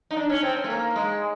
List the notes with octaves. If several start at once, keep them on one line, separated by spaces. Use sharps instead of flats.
D#4
D4
C#4
C4
C#4
A3
A#3
G#3